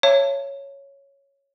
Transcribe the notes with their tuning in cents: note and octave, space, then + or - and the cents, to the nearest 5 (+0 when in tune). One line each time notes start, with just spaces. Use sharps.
C#5 +0 E5 +45 A5 +30